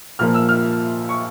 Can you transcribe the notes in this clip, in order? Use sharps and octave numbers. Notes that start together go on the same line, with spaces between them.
A#2 F3 A#3 F6
E6
F6
C#6